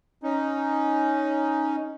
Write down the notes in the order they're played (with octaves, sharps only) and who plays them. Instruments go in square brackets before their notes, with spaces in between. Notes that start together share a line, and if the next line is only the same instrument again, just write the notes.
[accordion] C#4 D#4